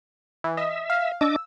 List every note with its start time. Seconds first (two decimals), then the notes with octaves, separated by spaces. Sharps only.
0.44 E3
0.57 D#5 E5
0.90 F5
1.21 D4 D#5 D6 E6